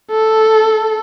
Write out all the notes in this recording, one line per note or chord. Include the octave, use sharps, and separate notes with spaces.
A4